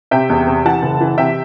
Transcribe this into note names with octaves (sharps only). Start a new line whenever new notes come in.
C3 E5 G5
E2
C3
E3 F#5 A5
F#1
E3
C3 E5 G5